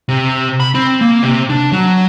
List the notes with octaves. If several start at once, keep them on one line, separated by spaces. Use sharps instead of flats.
C3
B5
C4
A#3
C3
D4
F#3